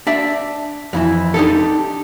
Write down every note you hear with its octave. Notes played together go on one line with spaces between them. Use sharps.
D4 D5 E5
F2 E3 E4
D4 D#4 G4 A4